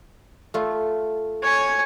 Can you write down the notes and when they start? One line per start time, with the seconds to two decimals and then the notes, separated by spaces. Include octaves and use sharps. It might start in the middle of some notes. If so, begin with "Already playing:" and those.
0.54 A3 F4
1.43 C#5 G#5